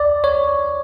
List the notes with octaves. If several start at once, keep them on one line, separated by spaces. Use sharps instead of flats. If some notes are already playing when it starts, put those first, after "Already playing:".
Already playing: D5
C#5